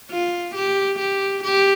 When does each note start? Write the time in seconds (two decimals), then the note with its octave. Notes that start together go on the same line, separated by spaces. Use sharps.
0.11 F4
0.55 G4
0.99 G4
1.44 G4